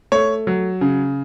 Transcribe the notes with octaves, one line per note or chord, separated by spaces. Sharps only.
A3 C#5
F#3
C#3